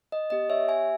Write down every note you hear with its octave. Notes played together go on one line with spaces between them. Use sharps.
D#5
B3 G4 D#5
C#5 E5
E5 G#5